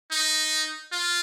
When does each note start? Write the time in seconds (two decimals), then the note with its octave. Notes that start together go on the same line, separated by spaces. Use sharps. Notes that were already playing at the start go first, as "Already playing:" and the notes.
0.11 D#4
0.92 F4